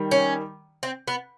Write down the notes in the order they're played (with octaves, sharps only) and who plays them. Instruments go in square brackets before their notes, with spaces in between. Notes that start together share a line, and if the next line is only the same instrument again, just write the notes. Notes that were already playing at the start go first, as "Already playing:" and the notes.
Already playing: [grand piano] D#3 G3
[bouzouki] C#4
C4
B3